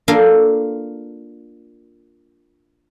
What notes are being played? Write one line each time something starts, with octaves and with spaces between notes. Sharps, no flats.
A#3 D4 F4 A4 D5 F5